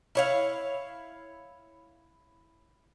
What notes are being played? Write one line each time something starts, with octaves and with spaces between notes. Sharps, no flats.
E4 C#5 F5